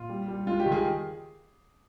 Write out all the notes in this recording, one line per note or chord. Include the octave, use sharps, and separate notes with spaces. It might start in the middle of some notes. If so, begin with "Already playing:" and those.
Already playing: A#2 F4
G3
G3
G#3 F4
G4
D#3
G#4